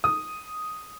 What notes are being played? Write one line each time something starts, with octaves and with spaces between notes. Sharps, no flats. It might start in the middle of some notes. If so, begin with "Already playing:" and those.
D#6